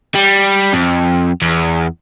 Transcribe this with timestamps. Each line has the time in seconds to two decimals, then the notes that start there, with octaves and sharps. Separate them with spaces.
0.15 G3
0.73 F2
1.42 E2